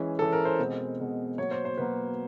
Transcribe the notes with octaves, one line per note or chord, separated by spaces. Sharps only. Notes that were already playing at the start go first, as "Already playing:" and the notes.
Already playing: E3 G#3 C#4
E3 G#3 C#4 A4
A#4
C5
B2 G#3 C4
B2 G#3 C4
B2 F#3 A#3 C#5
C5
C5
B2 F#3 A#3 B4